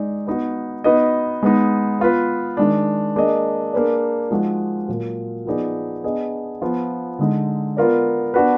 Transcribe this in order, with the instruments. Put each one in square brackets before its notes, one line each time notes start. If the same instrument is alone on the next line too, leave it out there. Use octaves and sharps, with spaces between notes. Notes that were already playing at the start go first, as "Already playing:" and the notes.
Already playing: [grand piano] G#3 D#4 G#4 D5
B3 D#4 F#4
B3 D#4 F#4 B4 D#5
G#3 B3 D#4
B3 F4 B4
D#3 G#3 D4
A#3 D4 G#4 D#5
A#3 D4 G#4 B4 D5
F3 G#3 D#4 F#4
A#2 F#3 A#3
F3 B3 D#4 G#4 D5
B3 D4 G#4 D#5
F3 B3 F4
D3 G#3 D#4
B3 F4 A#4 D5
B3 D4 F#4 B4